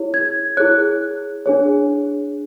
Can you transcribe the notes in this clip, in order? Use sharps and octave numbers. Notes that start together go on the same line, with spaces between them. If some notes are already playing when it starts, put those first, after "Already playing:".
Already playing: E4 G#4 C#5
G#6
E4 G#4 C#5 F#6
D4 G#4 C#5